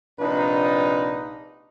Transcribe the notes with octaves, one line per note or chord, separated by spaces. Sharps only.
A#1 C3 D4 D#4 F4 B4